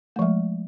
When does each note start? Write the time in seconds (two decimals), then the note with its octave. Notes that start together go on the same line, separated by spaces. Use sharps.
0.16 A3
0.19 F3
0.22 G#3